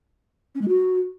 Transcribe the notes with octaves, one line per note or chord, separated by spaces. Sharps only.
C#4
G#3
F#4